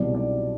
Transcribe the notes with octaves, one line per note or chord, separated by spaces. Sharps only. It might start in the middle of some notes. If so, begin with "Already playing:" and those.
Already playing: C2 B2 F#3 D5
D5